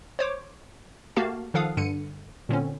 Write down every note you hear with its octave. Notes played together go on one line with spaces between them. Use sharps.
C5 C#5 D6
A3 A#3 F#4 G4 F5 A5
D#3 F3 A4 F5 F#5 D#6
G2 D3 C#7 D#7
A#2 D3 C4 C#4